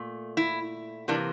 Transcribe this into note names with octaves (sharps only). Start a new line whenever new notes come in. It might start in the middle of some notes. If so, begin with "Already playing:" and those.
Already playing: A#2 A3
E4
C3 E3 A#3 D4